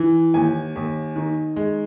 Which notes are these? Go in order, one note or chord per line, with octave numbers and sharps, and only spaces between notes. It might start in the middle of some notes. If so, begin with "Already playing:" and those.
Already playing: E3
D#2 G#5
D#2
D#3
G#3